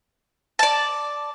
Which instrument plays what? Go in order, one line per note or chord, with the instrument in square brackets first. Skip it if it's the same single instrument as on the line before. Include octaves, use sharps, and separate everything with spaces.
[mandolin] D5 A5